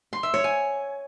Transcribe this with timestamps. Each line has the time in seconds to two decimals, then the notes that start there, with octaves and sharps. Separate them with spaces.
0.13 C6
0.23 E5
0.34 C#5
0.44 G#5